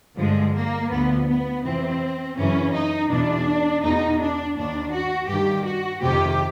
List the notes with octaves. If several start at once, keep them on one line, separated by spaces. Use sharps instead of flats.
G2 D3 F3 G#3
A#3
D2 D3 F3 B3
B3
F2 C3 E3 C4
F#2 C#3 E3 C#4
D#4
E2 B2 D4
E2 B2 D#4
D4
D#2 D#3 D4
F#4
G2 D#3 G4
F#4
F2 C3 D#3 G4